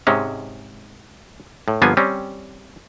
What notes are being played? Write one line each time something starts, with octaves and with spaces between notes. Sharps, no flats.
G#2 C3 G#3 C#4
A2
G1 F3 A#3 B3 F4 G#5
G3 C4 C#4